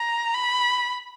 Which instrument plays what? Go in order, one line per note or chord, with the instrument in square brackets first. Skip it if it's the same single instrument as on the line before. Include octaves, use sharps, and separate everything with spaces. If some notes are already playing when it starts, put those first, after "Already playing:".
Already playing: [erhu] A#5
B5